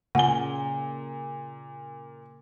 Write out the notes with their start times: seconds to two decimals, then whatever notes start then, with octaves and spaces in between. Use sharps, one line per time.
0.15 A#2 C#3 F#5 G#5 G7